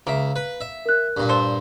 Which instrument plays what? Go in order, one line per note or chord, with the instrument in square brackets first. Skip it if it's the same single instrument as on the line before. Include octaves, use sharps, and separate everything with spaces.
[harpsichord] C#2 E5 [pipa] A#3
[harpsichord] B4
E5
[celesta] A#4 F#6
[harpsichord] G2 A#2
[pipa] A4 C5